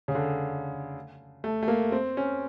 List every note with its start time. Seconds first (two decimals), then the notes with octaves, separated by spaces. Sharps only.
0.08 C#3
0.15 D3
1.44 A3
1.63 A3
1.68 A#3
1.92 C4
2.17 C#4